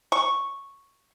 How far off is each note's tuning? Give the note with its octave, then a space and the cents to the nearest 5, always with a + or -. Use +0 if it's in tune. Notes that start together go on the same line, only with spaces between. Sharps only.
C#6 -5